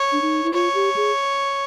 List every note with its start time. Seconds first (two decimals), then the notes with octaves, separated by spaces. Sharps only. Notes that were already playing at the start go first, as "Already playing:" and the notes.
Already playing: C#5
0.12 D4
0.22 D#4
0.44 E4
0.53 F4 C#5
0.75 G4
0.96 G#4